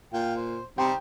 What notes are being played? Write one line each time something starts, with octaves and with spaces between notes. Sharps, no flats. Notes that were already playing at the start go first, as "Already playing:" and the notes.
A#2 F4 G5
C5
C3 G3 D#4 C5 G5